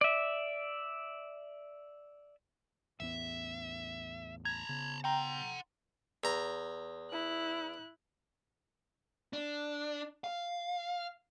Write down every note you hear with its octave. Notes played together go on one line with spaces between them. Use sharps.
D5 E5
A1 E2 B3 E5
A5 A#5 G#6
C#3 B3
F#5 G5 A#5 C6
E2 A#5
E4 F#6
D4
F5